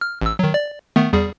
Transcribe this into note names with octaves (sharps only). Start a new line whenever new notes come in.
F6
A1 E6
D#3 F#3
D5
D#3 A3 B3
E2 G3 G#4